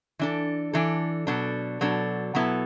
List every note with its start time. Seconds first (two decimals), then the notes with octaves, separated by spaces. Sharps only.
0.19 E3 D4 A4
0.73 E3 D4 A4
1.27 B2 F#3 D4 A4
1.81 B2 F#3 D4 A4
2.35 B2 F#3 B3 E4 A4